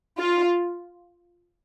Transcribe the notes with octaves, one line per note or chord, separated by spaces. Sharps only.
F4